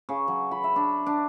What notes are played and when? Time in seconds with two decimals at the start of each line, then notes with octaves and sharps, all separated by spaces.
0.09 C#3
0.28 F#3
0.51 B5
0.64 E5
0.76 D4
1.06 D4